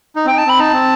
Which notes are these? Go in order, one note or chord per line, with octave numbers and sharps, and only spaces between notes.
D#4
C4 G5
D#4
A5
C4 B5
D#4 A5
C4